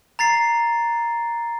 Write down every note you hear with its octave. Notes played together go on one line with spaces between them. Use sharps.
A#5 A6 C7